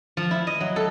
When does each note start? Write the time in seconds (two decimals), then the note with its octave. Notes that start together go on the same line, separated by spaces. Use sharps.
0.17 F3
0.31 E4
0.47 D#5
0.61 F#3
0.76 A4